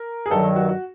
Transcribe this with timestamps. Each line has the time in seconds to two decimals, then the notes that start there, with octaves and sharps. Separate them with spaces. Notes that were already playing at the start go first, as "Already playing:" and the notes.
Already playing: A#4
0.26 G#4
0.30 G2 D#3 F#3 A4
0.56 F#4
0.69 F#4